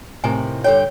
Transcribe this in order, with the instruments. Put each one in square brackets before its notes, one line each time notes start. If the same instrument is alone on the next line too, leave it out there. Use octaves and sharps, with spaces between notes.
[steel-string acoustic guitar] A2 C3 D#3 [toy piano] G#5
[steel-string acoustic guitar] G2 D3 G5 [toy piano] C#5